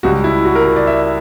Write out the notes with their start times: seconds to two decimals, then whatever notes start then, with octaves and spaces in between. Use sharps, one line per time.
0.03 C#2 C#3 G3 F#4
0.24 E4
0.45 F#4
0.55 A#4
0.66 A#4
0.76 D5
0.87 E5